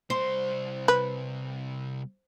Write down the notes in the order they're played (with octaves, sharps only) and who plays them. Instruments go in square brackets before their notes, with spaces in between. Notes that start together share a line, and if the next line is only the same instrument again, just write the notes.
[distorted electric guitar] C2 C6 [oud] C5
[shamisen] B4